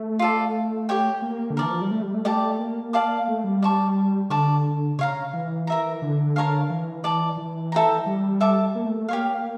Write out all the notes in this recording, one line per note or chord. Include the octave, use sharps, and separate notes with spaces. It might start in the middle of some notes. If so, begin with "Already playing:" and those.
Already playing: A3
F4 A4 D5
G4 C#5 G5
A#3
D3
E3 A#4 D5 A5
F3
G3
A3
G3
A3
A3 G4 D5 A5 D6
A#3
D5 F5 A5 D6
A3
G3
D5 A5 C#6
D3 D5 A5 C#6
C#3 C#5 F5 A#5
E3
A#4 E5 A#5
D3
A#4 C#5 F5 A5
E3
D5 A5 D6
E3
A4 E5 G5 A#5
G3
A4 E5 A5 D6
A#3
A3
A3
A#3 G4 C#5 F5